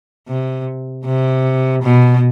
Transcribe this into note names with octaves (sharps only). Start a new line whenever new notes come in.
C3
C3
B2